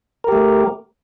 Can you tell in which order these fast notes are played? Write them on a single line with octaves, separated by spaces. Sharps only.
A#4 G4 A3